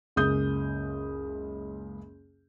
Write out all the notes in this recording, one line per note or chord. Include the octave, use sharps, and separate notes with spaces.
F#1 C#2 C#3 D#6 G6